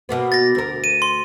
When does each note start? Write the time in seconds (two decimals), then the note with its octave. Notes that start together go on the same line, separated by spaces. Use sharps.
0.09 B2 A#3 B3
0.32 A6 A#6
0.55 D2 A#4
0.84 D#7
1.02 C6